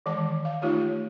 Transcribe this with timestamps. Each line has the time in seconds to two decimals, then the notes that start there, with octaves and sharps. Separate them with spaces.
0.06 D#3 E3 G#3 A5 D6
0.45 F5
0.62 A3 D#4 F4 G4 C#5